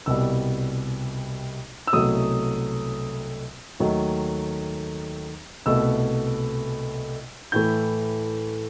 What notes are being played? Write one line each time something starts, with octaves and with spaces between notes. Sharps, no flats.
C2 B2 G3 E6
E6
C2 B2 F#3 A3 D#6
D#2 D#3 F#3 A3
C2 B2 A3 E6
A2 E3 A3 G6